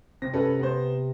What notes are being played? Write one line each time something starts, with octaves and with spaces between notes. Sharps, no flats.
C3 A#6
C#4 A4 B4
B3 C5